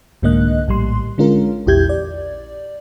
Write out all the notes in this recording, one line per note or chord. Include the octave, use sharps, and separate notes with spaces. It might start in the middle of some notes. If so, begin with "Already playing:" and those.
C2 G#2 D3 A#3 D#5 F#6
A#1 A2 G3 C6
D3 G#3 C#4 F4 A#4
A#1 E2 E4 G4 G6 G#6
D5